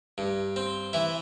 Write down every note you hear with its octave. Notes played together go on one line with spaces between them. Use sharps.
G2
C4
E3 E4